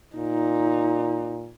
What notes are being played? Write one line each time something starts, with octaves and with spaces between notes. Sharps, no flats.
A#2 D#4